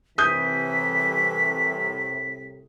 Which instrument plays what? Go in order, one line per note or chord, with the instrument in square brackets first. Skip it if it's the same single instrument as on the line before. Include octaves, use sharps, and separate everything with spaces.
[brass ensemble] C2 A2 C3 [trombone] E3 [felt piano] D#6 G6 [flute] B6